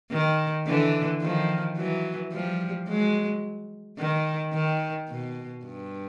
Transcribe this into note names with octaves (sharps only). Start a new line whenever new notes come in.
D#3
D3 E3
D#3 F3
E3 F#3
F3 G3
F#3 G#3
D#3
D#3
B2
G2